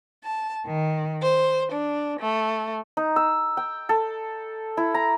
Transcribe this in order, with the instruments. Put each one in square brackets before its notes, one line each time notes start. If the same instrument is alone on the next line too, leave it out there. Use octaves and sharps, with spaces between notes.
[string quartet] A5
D#3
C5
D4
A3
[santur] D#4
E6
G5
A4
E4
A#5